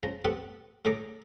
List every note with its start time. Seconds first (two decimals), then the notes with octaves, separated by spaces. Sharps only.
0.03 C#3 F3 A#5
0.25 B3 C4 G4 A4 F#5
0.85 A2 D3 G#4 A4 A#5 D6